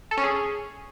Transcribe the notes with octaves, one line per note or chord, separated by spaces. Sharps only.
A4
C#4
G#4